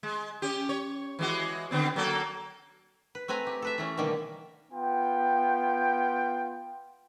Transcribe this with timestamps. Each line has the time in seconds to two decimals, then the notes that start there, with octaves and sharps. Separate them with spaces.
0.03 G#3
0.42 C#4 G4
0.69 C#5
1.19 E3 G#3 F#4
1.71 D3 B3 C4
1.96 F#3 A#3 A4
3.15 B4
3.28 A3 C4 B4 G#5 A#5
3.47 G4
3.62 A4 B4 E5
3.78 E3 A3 C#4
3.97 B2 D3 D#3 G3 A#3
4.72 B3 F4 G5